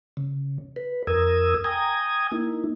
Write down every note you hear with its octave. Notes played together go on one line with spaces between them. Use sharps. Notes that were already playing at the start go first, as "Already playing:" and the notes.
C#3
B4
F2 A#4 D#6 E6 G#6
G5 G#5 A#5 D#6 G#6
A#3 D#4 E4